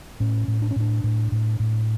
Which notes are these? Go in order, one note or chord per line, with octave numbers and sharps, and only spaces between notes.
A2 C#4
A2
D4
C#4
A2 D4
A2
A2
A2